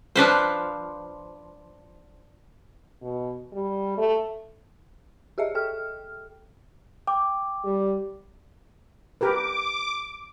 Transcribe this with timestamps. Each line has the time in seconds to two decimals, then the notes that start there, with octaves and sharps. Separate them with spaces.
0.16 F3 D4 B4 C5
3.02 B2
3.52 G3
3.97 A3
5.38 G4 G#4 D#5 E5
5.55 A4 G5 F6
7.07 G5 D6
7.64 G3
9.21 G4 A#4 B4 D6